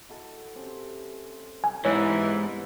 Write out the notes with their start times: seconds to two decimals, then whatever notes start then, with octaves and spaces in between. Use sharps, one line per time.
0.09 E4 F#4 A4
0.56 C4 C#4 G4
1.64 G#5
1.85 G#2 C3 E3 B3 D#4 C#5